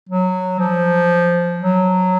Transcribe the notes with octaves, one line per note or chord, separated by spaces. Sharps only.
F#3
F3
F#3